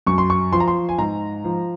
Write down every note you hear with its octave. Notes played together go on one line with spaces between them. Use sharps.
F#2 C#6
C6
C#6
F3 C6
A#5
C6
G#5
G#2 A#5
F3